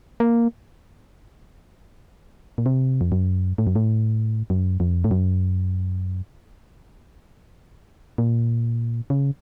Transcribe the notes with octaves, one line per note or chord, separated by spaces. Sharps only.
A#3
A#2
C3
F2
F#2
A2
F#2
A2
F#2
F2
A2
F#2
A#2
C#3